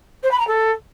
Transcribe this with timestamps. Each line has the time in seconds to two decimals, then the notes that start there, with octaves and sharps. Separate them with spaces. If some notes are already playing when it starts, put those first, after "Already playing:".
0.23 C5
0.31 B5
0.39 A#5
0.47 A4